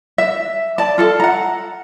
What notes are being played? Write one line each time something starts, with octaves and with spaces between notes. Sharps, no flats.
E5
D5 A5
F4 A4 A5
F#5 A#5